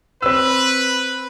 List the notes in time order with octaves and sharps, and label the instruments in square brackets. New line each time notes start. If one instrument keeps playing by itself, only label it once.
[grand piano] C4 E6 [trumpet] B4